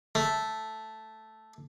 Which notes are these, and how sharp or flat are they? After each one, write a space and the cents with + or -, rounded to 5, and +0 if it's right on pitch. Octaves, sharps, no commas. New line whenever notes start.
A3 -5